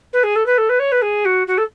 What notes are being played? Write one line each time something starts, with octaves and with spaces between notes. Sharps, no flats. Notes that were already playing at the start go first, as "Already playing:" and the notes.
B4
G#4
A4
B4
A4
B4
C#5
B4
G#4
F#4
F#4
A4